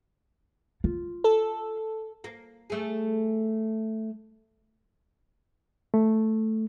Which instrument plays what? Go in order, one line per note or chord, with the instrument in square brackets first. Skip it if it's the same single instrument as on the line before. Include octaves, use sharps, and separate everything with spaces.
[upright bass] F4
[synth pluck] A4
[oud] A#3
A3 G#4
[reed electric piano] A3